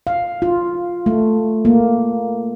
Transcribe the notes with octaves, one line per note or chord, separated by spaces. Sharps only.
F5
F4
A3
A#3